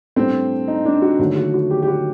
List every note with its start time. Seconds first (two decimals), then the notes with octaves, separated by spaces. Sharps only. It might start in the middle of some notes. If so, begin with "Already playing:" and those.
0.16 A2 G3 C4 D4 A4
0.68 D#4
0.85 D4
1.02 F#4
1.19 D#2 D3 F#3 A3 D#4
1.36 F#4
1.54 F#4
1.71 G4
1.83 G4
1.88 F#4